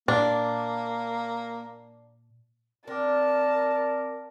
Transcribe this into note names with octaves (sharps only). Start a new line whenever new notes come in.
A#2 A#3 D4
C4 D4 A#4 G5 A5 D6